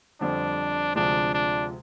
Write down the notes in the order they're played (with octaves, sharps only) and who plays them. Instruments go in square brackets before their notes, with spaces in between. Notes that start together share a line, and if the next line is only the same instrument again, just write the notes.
[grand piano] F2 D3 G3 C4 [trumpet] D4
[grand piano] D2 C3 F3 G#3 [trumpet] D4
[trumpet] D4